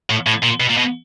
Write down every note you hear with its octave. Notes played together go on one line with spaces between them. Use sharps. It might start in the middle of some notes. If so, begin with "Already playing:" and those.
A2
A2
A#2
B2
A#2
B2